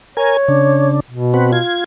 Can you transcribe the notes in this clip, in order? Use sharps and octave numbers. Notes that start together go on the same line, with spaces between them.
A#4 C#5 G#5
C#3 D4
B2
C4 F#4 B4
F4 G#6